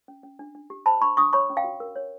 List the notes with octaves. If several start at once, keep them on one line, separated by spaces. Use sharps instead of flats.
C#4
C#4
D4
D4
G4
C5 A5 B5
D4 B5 C#6
D4 C#6 D#6
C#5 B5 C#6
C#4
F5 G5
F#4
A#4
C#5